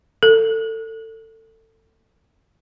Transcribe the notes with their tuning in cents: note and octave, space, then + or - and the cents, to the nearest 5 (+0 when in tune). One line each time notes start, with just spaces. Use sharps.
A4 +25